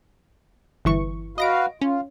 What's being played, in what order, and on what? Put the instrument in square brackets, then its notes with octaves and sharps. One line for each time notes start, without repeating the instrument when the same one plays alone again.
[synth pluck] G1 E3 C#6
[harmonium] F#4 B4 F5 [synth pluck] D#5 A#6 D7
[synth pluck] C#4 [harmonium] F4